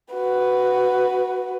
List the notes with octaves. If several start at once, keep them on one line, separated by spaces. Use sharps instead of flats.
F#4 B4